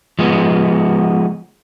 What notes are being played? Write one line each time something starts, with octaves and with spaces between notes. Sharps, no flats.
F3 G#3 B3